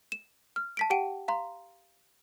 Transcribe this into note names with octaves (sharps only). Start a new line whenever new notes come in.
E7
F6
A5 B6 D7
G4 F#5 G5 D7 D#7
F5 A#5 C6